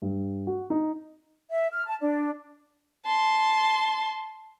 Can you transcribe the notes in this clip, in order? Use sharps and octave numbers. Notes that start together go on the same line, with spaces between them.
G2
F#4
D#4
E5
F6
A5
D4
A5 C6